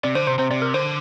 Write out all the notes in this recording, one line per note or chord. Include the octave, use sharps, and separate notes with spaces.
C3 D5
D3 C5
C3 C5
C3 C5
C3 D5
A#4
D3 C5